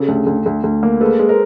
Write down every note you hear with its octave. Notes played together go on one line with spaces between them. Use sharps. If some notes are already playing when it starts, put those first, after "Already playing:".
Already playing: C#3 G4 A4
D2
D2
D2
D2
A#3
G#3 A4 B4
G#3
A#4 C5